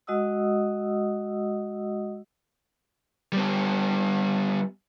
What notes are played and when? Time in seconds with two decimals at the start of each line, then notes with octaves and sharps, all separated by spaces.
0.07 G#3 F#4 D#5 F#5 D#6 E6
3.32 G3 B3